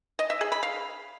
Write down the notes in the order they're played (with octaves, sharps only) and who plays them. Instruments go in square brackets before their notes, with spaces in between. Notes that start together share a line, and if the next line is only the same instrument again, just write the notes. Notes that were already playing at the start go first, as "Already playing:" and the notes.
[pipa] D#5
E5
G#4
B5
F5